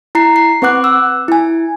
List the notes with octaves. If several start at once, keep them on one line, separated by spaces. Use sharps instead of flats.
E4 A#5 C7
C7
C4 B4 F#5 D6 F#6
E6
E4 G#5